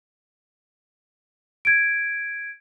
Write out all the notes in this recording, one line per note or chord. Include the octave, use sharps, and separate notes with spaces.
G#6 D7